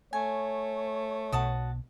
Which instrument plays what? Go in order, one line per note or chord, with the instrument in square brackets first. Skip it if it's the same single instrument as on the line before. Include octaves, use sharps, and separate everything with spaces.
[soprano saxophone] A3 [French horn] C#5 [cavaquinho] G#5
[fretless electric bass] B1 B2 [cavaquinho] F#4 A5 D#6